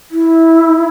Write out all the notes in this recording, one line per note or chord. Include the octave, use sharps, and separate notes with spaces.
E4